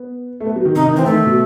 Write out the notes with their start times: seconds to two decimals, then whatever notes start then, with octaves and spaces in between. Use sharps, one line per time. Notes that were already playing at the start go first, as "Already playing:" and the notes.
Already playing: B3
0.40 A3
0.45 B3
0.56 F#3
0.65 D#3
0.75 C3 D#4
0.86 D#3
0.96 E3 C4
1.05 D#3 A3
1.26 B2